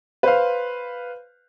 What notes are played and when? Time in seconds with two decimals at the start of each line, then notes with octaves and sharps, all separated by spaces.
0.23 B4 C5 F5